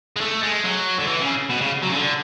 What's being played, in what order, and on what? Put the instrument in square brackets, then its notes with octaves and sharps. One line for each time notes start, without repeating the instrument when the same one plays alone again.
[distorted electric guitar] G#3
A3
G#3
F#3
D3
E3
C#3
B2
C#3
F#3
C#3
D3